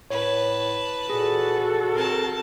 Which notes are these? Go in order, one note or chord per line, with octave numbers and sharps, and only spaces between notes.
A2 B4 C#5 A5
A#2 F#4 G#4 A4
C4 A#4 A5